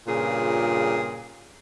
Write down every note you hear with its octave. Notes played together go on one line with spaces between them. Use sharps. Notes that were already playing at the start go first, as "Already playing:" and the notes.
G2 A#2 C#3 F4 G#4